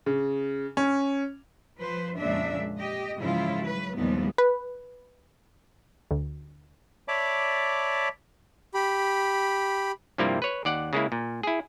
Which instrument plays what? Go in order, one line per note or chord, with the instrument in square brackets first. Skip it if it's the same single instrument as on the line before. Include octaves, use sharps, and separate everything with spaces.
[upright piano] C#3
C#4
[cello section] F3 B4 C5
F2 A#2 C#3 G#3 D4 E5
G4 D#5
G#2 C#3 E3 F3 E4 F4
F#3 B4
D#2 A2 F3 G3 G#3 B3
[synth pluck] B4
D2
[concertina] C#5 D5 E5 A5 B5 D6
[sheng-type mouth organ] G4 B5
[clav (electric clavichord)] G2 C3 F3 G3 A#3 E4
B4 C#5
D#2 D5 F#5
C#3 G#3 A#3 E4
A#2
E4 G#4